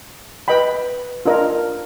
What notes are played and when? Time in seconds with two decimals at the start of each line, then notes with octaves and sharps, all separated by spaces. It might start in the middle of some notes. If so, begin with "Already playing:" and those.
0.48 B4 D#5 G5 B5
1.26 D4 F4 A#4 D#5